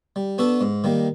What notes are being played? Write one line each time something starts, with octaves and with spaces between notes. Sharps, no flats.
G3
B3 D4 F#4 A4
G#2
D#3 G3 A#3